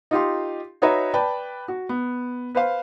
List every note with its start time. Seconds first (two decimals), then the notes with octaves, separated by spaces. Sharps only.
0.11 D#4 F4 G4 C6
0.82 D#4 F#4 B4 C#5 E5 A#5
1.14 B4 D5 G5 A5 B5
1.68 F#4
1.89 B3
2.55 B4 C5 F5